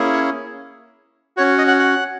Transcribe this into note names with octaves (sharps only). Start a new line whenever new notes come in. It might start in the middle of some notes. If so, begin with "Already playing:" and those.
Already playing: A#3 C#4 E4 G#4
C#5
C#4 F#4 C#5
D#5
F#5
F#5